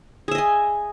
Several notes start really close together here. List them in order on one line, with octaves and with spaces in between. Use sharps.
G#4 E5 D#5 G#5